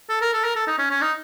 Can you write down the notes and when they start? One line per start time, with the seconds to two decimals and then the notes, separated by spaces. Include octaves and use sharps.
0.09 A4
0.21 A#4
0.33 A4
0.44 A#4
0.56 A4
0.67 D#4
0.78 C#4
0.91 C#4
1.01 D#4